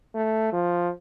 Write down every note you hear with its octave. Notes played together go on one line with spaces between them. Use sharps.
A3
F3